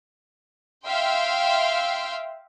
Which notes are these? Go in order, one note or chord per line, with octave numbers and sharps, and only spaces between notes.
E5 F5 G5 C6